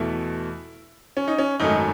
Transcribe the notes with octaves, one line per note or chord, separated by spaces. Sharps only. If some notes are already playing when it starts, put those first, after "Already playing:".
Already playing: E2 B2 A3 E4
C#4
D#4
C#4
G#1 F#2 D#3 A3 D#4